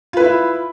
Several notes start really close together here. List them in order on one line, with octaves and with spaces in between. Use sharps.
F4 B4 E4 E5